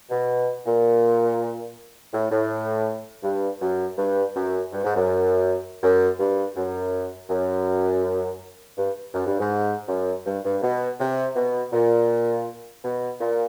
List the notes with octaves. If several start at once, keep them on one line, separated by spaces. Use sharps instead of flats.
B2
A#2
A2
A2
G2
F#2
G2
F#2
G2
G#2
F#2
F#2
G2
F#2
F#2
G2
F#2
G2
G#2
F#2
G2
G2
B2
C3
B2
A#2
B2
A#2